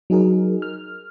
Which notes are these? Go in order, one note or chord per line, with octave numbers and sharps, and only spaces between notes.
F#3 D#4 G#4 A#4
F6